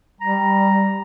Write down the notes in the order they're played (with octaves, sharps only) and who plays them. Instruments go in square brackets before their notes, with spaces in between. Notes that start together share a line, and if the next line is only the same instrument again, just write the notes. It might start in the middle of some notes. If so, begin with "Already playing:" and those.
[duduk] G3 [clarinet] A#5